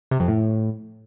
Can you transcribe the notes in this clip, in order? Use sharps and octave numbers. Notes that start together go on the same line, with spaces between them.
C3
F2
A2